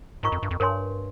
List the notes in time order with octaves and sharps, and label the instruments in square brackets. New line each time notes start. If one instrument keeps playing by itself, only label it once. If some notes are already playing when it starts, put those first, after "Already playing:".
[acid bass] G#2 [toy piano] F4 A#4 D#5 A#5 C#6
[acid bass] F2
G2
F2
[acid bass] G2 [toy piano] A#4 C#5 G#5 C6